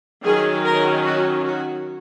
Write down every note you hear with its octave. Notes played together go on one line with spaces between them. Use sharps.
D#3 F#3 C#4 G#4
A#4
F#4
F#4